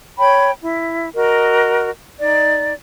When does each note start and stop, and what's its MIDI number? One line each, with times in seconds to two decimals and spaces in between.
0.19 0.51 73
0.19 0.51 79
0.19 0.51 83
0.60 1.08 64
1.15 1.90 66
1.15 1.90 70
1.15 1.90 75
2.20 2.72 63
2.20 2.72 74